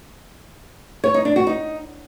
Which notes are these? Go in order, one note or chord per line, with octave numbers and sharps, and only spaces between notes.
C#5
D#4
D4
F#4
D#4